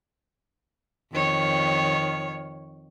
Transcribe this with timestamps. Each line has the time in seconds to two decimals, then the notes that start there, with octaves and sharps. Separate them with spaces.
1.12 F2 D#3 C#5